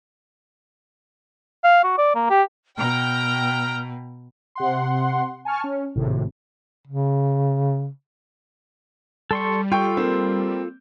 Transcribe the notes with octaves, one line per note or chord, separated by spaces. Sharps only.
F5
F#4
D5
A#3
G4
B2 G5 A#5 F6
C3 F#5 C6
G#5 A5 C#6 F6
C#4
G#1 A2 C3
C#3
G3 A4 C6 C#6
F4 A4 G5 C#6 G6
A#3 C4